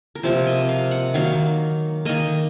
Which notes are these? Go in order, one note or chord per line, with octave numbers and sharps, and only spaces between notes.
A#4
C3 F3 A#3 C5
D#5
F5
F#5
D#3 F#3 A#3 F5
D#3 A#3 D#5